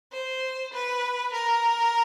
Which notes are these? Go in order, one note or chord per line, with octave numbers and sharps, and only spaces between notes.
C5
B4
A#4